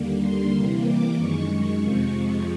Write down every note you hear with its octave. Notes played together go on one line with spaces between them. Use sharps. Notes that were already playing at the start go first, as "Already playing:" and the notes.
Already playing: D#2 D3 G3 A#3
C6
C3 E3 G3 A#3
D6
F#2 D#3 G#3 C#6
C#6
F2 C3 F3 G#3 C#6